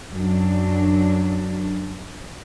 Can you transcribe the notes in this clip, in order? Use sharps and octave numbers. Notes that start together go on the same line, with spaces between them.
F#2 F#3 D4